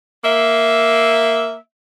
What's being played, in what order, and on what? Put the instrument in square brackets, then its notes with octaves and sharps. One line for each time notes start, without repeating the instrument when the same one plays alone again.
[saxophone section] A#3 E5